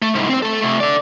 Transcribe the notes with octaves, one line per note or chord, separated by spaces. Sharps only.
A3
C2 G#2
C4 C5
A3 A4
C3 A3
A4 D5